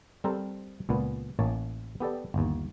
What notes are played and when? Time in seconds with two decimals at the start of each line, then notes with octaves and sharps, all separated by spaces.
0.24 G3 C4 A4 A#4 C5 A#5
0.89 C#2 A#2 B3
1.39 A1 A#3 C#5 A5
2.00 B3 G4 A4 D5
2.34 G1 D#2